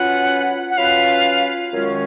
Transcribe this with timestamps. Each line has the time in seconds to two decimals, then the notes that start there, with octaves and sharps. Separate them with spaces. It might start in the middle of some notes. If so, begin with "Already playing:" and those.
Already playing: F#3 C#4 F4 B4 F#5
0.70 F#5
0.77 F#3 C#4 F4 B4 F5
1.72 F#2 D#3 G#3 C#4 F4